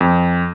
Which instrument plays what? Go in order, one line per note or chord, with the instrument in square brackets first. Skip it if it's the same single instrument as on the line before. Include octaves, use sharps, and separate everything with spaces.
[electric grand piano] F2